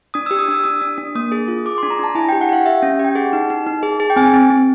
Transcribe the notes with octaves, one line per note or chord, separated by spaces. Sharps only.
D4 D#6
G4 E6
D#6
D4 E6
D4 D#6
D4
D4
A#3 D#6
G#4
F4
G#4 D6
C6
D4
A#5
D4 A5
E4 G#5
G5
G4
F#5
G4 F5
G4 E5
C#4
G4
G5
G#4 F#5
D#4
D#4
D#4
G#4
G#4
G5
C4 G#5
C4
C4